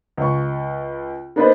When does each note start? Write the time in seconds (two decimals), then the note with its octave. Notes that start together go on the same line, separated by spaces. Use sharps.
0.17 C#2 C#6
1.36 A#3 B3 D4 D#4 B4 C5